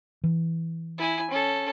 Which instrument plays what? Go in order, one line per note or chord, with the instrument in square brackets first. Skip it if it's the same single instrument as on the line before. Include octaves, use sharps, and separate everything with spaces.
[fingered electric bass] E3
[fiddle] E4 G#5
C#4 A4